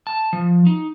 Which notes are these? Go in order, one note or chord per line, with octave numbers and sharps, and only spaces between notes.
A5
F3
D#4